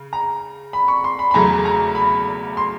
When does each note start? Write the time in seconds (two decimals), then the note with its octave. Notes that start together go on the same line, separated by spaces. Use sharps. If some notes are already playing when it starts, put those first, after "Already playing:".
Already playing: C#3
0.13 A#5
0.73 B5
0.88 C#6
1.04 C6
1.19 B5
1.31 B5
1.34 E2 C#3 F#3 A3 A#5
1.65 A#5
1.95 B5
2.57 C6